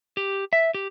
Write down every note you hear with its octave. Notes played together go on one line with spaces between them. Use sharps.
G4
E5
G4